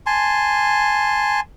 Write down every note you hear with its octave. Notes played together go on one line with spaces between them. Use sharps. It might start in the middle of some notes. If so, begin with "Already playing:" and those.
G#5 A5 C6